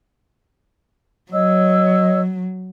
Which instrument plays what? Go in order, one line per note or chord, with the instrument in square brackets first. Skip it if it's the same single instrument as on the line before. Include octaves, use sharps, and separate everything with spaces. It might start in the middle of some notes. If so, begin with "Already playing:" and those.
[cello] F#3 [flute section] C#5 D#5 E6